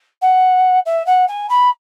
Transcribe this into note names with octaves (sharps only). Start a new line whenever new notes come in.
F#5
E5
F#5
G#5
B5